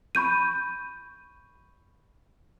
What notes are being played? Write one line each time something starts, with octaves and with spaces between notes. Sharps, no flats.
B5 C#6 G6 D#7